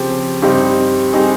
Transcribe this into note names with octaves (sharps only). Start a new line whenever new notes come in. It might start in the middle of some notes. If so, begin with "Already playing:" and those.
Already playing: C#3 F3 C4 G4
G2 G3 C4 D#4 G4
G3 C4 D#4 G#4